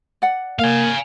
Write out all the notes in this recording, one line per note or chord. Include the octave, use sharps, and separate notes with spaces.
D5 F#5
A#3 F5 G#5